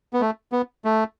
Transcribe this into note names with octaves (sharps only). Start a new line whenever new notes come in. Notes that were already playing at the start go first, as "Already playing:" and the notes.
B3
A3
B3
A3